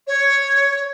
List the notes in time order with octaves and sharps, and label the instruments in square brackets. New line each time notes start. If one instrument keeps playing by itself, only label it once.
[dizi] C#5